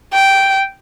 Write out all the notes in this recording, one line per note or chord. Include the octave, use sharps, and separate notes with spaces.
G5